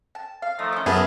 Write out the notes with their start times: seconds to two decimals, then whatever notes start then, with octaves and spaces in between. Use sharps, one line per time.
0.15 A5
0.42 F5
0.59 D#3 F3 A3 D#4
0.72 C#4 E4
0.86 F#2 B3 G#4 A#4 B4 E5 A5